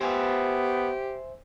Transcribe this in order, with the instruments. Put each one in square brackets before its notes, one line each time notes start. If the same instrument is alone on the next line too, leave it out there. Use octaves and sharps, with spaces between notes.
[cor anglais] B3 [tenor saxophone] G4 [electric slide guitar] C5 E5 G#5